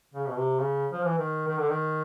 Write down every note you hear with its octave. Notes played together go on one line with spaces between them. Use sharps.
C#3
B2
C3
C#3
F3
E3
D#3
D#3
D3
D#3